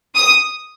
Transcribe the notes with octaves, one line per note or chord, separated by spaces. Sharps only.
D#6